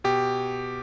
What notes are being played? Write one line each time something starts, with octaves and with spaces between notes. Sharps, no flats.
B2 G4